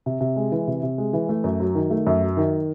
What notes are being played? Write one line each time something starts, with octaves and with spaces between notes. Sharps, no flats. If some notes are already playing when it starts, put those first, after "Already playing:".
C3
C3
G#3
E3
C3
C3
G#3
E3
A3
F#2
F#3
D#3
A3
F#2
F#3
D#3